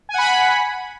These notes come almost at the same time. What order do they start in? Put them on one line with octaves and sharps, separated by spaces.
G#5 F#5 B5